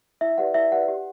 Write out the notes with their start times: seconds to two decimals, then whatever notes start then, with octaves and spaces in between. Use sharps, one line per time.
0.21 E4 E5
0.38 G4 B4 D5 F#5
0.54 E4 E5
0.72 G4 B4 D5 F#5
0.88 G4